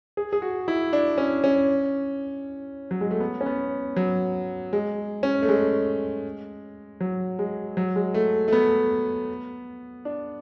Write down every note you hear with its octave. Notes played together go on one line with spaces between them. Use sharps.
G#4
G#4
F#4
E4
D4
C#4
C#4
F#3
G#3
A3
B3
C#4
B3
F#3
G#3
C#4
A3
G#3
F#3
G#3
F#3
G#3
A3
A3
B3
D4